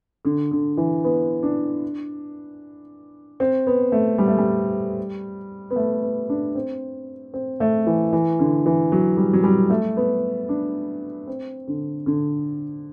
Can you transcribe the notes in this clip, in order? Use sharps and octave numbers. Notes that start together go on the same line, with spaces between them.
D3
D3
E3
B3
D4
C4
B3
A3
G3
A3
G3
B3
A3
B3
D4
C4
C4
A3
E3
E3
D3
E3
F#3
G3
F#3
G3
A3
B3
D4
C4
D3
D3